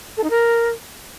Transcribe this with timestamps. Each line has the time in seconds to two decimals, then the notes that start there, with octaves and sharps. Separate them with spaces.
0.17 A4
0.24 D#4
0.30 A#4